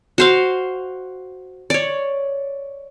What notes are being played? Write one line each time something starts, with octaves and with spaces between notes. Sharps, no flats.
F#4 C5 F5
C#5 D5